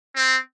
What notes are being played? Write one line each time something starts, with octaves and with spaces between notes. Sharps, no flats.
C4